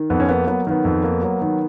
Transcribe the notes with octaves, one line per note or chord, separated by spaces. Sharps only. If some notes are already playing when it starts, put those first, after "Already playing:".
Already playing: D#3
F2 B3
C#4
A#3 B3
F#3 B3
D#3 B3
F2
A#3
F#3
D#3